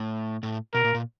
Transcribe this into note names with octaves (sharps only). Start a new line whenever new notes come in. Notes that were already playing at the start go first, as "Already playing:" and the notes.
Already playing: A2
A2
B2 A#4
A#2
A#2